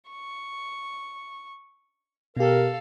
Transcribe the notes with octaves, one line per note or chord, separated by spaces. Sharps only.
C#6
B2 G4 A4 A#4 F5